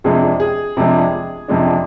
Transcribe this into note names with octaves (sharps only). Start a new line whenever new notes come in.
F2 C3 F3 G#3 D4 G#4
G#4
F2 C3 F3 G#3 D4
F2 C3 F3 G#3 D4